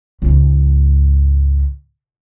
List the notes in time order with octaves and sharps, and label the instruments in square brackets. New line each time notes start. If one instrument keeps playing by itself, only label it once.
[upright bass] C#2 G#2